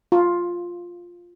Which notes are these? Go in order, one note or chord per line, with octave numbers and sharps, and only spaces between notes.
F4